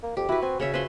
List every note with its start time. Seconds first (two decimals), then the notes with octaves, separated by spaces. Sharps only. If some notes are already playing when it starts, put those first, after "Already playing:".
0.03 A#3
0.17 F2 G4
0.29 E4 F#4 B4
0.42 C4 G#5
0.60 C#3 C#4 C#5 E5
0.74 F3 B4 E5 C6